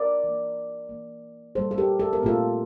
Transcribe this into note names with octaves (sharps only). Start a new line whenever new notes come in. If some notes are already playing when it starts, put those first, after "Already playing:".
Already playing: A#4 D5
E3 A#3
E3 A#3
A#2 G3 A#3 A4 C5
A4
G4 A#4
A4
A#4
A#2 A3 C4 F4 A4